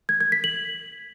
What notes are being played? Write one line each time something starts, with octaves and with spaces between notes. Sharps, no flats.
G#6
G#6
B6
F#7